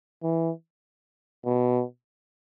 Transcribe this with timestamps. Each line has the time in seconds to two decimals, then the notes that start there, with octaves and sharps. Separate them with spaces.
0.23 E3
1.45 B2